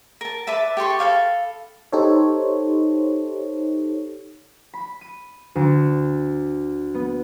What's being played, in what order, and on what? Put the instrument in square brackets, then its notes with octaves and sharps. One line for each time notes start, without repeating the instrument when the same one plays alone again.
[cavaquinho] A#4 A5
B4 D5 E5 A5
G4 A4 C6 C#6
A4 C#5 F5 B5
[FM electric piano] D#4 G4 A4 C5 C#5
[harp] B5
D#7
D2
B3